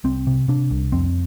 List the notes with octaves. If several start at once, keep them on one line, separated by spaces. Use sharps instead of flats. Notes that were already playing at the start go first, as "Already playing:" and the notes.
C2 C4
C3
C3 D4
C2
F2 C4